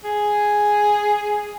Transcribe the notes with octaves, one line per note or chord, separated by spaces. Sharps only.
G#4